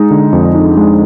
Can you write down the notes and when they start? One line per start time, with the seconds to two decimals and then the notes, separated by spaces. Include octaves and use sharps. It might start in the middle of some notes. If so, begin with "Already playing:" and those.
Already playing: G#3 D#4
0.11 D3
0.33 F2
0.55 D#4
0.77 G#3